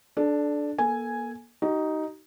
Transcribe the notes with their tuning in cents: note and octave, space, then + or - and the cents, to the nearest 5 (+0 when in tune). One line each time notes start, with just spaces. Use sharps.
D4 +0 A4 -30
A#3 +40 A4 +0 G#5 +0
D#4 +5 G4 -45